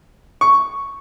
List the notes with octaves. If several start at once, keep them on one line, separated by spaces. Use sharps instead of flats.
C#6